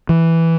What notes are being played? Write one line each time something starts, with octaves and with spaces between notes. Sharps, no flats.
E3